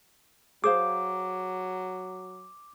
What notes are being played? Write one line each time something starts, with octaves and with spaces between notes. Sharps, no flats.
F#3 G#4 C5 F5 D6